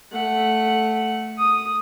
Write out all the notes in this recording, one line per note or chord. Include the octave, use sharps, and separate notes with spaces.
A3 F#5
D#6